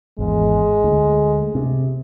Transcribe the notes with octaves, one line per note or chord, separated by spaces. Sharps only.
G#1 E2 G#3
D2
C3